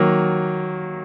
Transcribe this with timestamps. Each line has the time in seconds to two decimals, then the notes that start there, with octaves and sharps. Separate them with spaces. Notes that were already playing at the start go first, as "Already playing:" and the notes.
Already playing: D#3 F#3 A#3